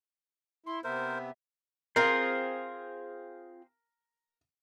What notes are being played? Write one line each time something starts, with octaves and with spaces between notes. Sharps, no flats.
E4 C6
C3 B3 A#4 C5 E5
C4 F4 G#4 A#4 C5